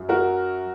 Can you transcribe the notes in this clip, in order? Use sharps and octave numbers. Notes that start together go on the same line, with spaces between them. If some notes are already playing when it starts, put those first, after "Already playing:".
Already playing: F#2
F#4 A#4